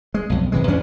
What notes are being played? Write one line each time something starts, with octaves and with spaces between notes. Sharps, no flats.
G#3
B1 F2
G#1 C3 E3 G#3
E2 C#4 D4